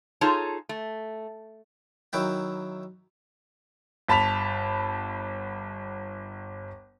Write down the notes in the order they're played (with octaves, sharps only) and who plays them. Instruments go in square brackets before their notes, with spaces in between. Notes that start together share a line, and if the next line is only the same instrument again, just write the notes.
[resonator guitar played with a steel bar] D#4 F4 G#4 A4 C#5 A5
A3
[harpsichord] D#3 F#3 E4 G5
[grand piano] G1 A5 B5 B6 F7